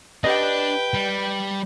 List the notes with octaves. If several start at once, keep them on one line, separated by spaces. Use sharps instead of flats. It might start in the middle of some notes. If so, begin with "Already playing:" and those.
D4 G4 B4 D5 D#5 G5
G3